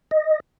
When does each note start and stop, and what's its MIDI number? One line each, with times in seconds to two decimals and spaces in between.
0.11 0.40 75